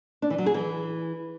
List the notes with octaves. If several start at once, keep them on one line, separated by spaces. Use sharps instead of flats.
D4
E3
F#3
G#4
E3